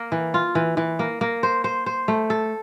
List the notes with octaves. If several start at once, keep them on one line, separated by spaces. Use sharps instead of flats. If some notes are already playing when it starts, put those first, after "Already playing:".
Already playing: A#3
E3
F4
E3
E3
A#3
A#3
C5
C5
C5
A3
A4